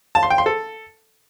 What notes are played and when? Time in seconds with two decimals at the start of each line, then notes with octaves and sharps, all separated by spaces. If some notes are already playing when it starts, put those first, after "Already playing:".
0.15 A5
0.23 C6
0.30 G5
0.38 C6
0.46 A4